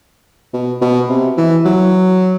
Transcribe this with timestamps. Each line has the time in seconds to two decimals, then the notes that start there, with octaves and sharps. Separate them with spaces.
0.53 B2
0.81 B2
1.09 C3
1.37 E3
1.65 F#3